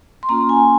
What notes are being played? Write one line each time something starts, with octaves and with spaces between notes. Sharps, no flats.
C6
A#3 C#4 F4 A#5
G#5